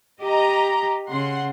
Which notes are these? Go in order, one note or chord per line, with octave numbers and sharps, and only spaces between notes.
G4 D#5 A#5
C#3 F#5 C6